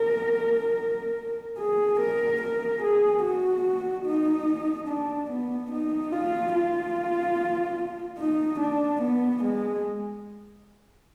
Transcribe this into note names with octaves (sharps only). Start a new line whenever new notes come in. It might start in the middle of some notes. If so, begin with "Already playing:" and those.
Already playing: A#4
G#4
A#4
A#4
G#4
F#4
D#4
D4
B3
D#4
F4
F4
D#4
D4
B3
G#3